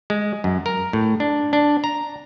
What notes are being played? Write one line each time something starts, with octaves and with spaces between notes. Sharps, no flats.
G#3
F#2
A#4
A2
D4
D4
A#5